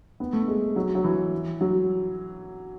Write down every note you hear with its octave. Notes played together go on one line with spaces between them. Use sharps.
B3
A3
G#3
F#3
F#3
E3
F#3